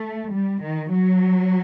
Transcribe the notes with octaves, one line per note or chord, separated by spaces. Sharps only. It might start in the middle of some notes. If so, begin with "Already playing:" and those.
Already playing: A3
G3
D#3
F#3